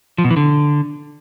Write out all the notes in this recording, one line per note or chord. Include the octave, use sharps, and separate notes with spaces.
F3
B2
E3
D3